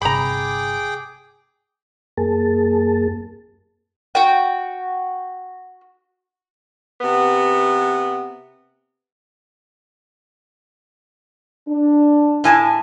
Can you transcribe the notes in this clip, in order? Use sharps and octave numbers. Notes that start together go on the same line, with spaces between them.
G1 C3 G#4 G5 A#5 B5 D6
F#2 A#3 G#4 A5
F#4 G5
C3 B3
D4
A2 G#5 A5